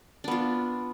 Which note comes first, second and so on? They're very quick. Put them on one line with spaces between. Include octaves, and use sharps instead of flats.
D4 B3 F4